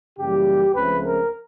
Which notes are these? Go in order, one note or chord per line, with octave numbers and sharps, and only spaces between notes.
F#2 C#3 E3 G3 A#3 G4
C#2 C#3 F3 A3 C4 B4
A#4